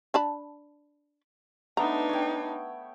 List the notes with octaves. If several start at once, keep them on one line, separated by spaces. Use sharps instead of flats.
D4 A5 B5
A3 B3 D4 D#4 A5 A#5
C#5 G5